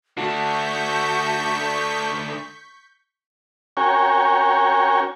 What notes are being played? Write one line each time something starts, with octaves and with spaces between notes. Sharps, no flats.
D3 A3 F#4 A5 C#6 G6 B6
C#4 F#4 A#4 C#5 G5 G#5